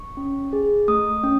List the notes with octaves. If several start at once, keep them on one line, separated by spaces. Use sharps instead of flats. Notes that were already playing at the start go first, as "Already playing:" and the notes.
Already playing: C#6
C#4
G#4
A3 D#6
C#4